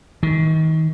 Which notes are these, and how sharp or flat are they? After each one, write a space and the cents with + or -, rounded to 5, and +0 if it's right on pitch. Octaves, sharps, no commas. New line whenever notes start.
D#3 +30